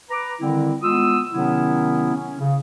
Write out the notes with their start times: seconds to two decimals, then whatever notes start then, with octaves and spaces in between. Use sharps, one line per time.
0.10 B4 A#5 D6
0.40 D3 D#3 G3 C4 E4
0.81 G#3 B3 F4 D#6 E6
1.31 C3 D#3 F#3 B3 C#4 E4
2.15 C#4
2.39 C#3